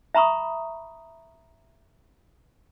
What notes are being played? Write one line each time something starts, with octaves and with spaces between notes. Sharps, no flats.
E5 A#5 B5 C#6 D#6